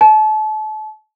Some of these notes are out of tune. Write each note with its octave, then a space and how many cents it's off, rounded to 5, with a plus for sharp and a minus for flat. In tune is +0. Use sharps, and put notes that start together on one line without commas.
A5 -35